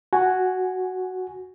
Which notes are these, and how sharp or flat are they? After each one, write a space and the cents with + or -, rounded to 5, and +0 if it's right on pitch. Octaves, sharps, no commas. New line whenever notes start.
F#4 +0 G#5 +0